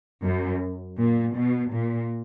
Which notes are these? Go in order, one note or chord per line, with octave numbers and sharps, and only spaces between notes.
F#2
A#2
B2
A#2